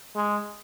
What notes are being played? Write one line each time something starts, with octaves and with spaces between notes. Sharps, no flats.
G#3